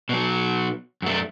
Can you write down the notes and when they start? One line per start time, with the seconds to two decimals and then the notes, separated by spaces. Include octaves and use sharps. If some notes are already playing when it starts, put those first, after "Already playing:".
0.09 B2 F#3
1.02 F#2 A3